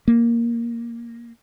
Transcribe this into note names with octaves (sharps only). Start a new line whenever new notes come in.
A#3